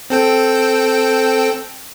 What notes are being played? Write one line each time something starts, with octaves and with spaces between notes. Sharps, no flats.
C4 A4 G5